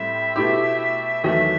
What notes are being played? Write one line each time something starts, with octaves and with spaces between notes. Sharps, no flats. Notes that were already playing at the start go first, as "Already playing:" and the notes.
Already playing: A2 G3 C4 E5
B2 A3 E4 G4
E2 D#3 F#3 A3 E5